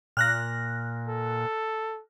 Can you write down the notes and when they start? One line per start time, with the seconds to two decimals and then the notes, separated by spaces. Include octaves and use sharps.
0.17 A#2 F6 F#6 A#6
1.08 A4